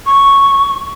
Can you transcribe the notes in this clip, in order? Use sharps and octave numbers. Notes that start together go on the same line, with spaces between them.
C#6